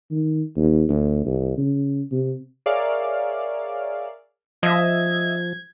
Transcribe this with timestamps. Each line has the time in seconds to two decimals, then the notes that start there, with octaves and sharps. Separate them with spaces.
0.11 D#3
0.56 D#2
0.89 D2
1.25 C2
1.58 C#3
2.12 C3
2.66 G#4 A#4 C#5 D5 E5 F5
4.63 F3 D#5 E5 G#6